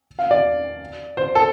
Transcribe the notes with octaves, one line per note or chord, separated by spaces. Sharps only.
F5
D5
C5
A4